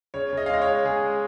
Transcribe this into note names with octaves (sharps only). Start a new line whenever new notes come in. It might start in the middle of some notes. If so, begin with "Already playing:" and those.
C#3 C#5
C#3 D#5
F5
G#3 D#5
C#5
G#3
C#3 G#4
G#3